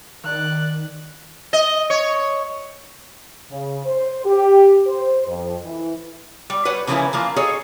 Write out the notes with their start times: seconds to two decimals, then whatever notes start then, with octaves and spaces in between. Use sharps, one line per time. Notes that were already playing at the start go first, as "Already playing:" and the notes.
0.24 D#3 D5 F#6
1.53 D#5
1.90 C#5
3.50 C#3
3.86 C5
4.25 G4
4.87 C5
5.27 F2
5.65 E3
6.50 G3
6.65 G3 B4 C#5 F#5
6.87 C#3 E3 F3 A#3 C#4 E4
7.13 E3 F3 A#3 F4
7.36 G#4 A4 C#5 D#5 F5